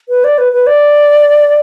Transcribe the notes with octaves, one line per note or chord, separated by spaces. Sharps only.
B4
D5
B4
B4
D5